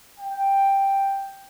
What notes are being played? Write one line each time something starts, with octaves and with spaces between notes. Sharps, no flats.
G5